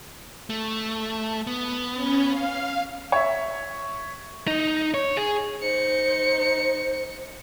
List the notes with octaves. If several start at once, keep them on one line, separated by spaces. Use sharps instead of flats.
A3
B3
C#4
F5
C#5 E5
D#4
C#5
G#4
D#4 C5 C#7